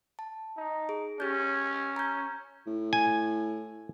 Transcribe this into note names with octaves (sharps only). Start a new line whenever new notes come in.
A5
D#4
G#4
C#4 G4 G6
A#5 G6
A2
G#5